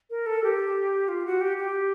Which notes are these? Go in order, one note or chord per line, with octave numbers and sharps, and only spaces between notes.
A#4
A4
G4
F4
F#4
G4
G4